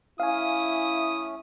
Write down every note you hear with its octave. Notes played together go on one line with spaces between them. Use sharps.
A3 C#4 E4 F5 G#5 D#6